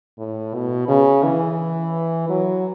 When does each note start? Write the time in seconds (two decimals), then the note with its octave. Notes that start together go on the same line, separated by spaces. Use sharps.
0.19 A2
0.54 B2
0.88 C#3
1.24 E3
2.29 F#3